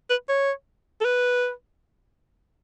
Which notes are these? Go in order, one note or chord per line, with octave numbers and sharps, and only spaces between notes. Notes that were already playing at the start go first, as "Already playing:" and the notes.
B4
C#5
A4
B4